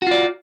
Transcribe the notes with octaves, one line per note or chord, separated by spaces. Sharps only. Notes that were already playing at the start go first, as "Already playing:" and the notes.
F4 F#4 D5